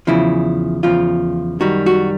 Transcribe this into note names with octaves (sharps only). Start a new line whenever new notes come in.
E2 C#3 F3 E4
E2 C#3 F3 F4
F#2 D#3 G3 F#4
F#4